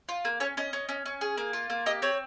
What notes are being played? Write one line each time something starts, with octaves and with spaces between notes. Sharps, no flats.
F4
A#3
C#4 C#5
C#4 D#5
C#4
C#4
C#4
G#4
A#3
F4
A#3
G4 D#5
C4 C#5